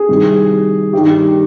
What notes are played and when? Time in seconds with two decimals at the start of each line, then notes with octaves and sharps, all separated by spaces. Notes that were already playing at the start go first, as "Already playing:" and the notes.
Already playing: G#4
0.09 C2 C3 D#3
0.93 G2 D#3 G4